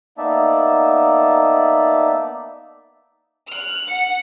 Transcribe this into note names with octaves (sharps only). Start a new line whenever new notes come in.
A#3 B3 D#4 D5 E5 A5
F6 F#6
F#5 C#7